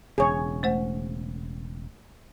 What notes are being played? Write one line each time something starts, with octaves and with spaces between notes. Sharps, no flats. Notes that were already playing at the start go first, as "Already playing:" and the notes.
E1 C#3 G#4 C#5
A3 C5 F#5